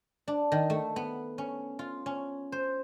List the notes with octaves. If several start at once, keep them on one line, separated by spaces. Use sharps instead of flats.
D4
D#3
A3
B3
C#4
F4
C#4
C5